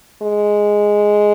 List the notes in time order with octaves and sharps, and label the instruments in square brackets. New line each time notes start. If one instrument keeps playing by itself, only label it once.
[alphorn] G#3